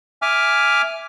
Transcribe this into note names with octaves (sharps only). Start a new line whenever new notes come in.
E5 G#5 D6 F6